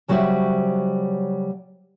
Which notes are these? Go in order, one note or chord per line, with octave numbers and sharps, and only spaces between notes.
C#3 F#3 G3 F#4 C5 E5